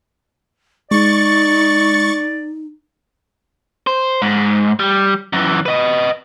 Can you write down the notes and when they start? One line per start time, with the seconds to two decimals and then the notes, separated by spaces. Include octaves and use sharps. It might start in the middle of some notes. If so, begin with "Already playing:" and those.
0.91 G#3 D#4 D5 C#6 A6
3.87 C5
4.22 G#2
4.80 G3
5.33 F#2 E3
5.66 B4 D#5